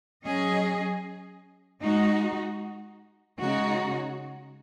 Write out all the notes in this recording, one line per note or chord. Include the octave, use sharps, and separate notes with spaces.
F#3 C#4 G#4 D#5
G#3 D#4 F#4
C#3 G#3 D#4 F#4 C#5